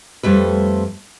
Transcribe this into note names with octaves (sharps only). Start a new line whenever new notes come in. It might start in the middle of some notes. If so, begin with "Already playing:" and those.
F2 G3 A3 B4